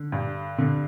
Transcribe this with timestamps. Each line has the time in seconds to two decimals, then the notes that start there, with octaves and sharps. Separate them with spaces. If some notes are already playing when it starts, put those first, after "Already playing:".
Already playing: D3
0.12 G2
0.58 D3